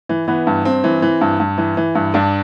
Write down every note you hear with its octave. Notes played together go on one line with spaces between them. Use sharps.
E3
E3 B3
G2
G2 C4
E3
E3
G2
G2
E3
E3
G2
G2 D4